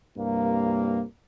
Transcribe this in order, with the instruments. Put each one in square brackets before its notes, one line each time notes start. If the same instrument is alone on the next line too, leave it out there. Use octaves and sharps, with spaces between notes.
[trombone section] C2 G2 A#3